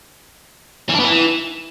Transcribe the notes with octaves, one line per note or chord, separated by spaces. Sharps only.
E3
D4
B3
E3